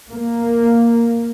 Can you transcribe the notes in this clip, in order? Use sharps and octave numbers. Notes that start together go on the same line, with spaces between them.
A#3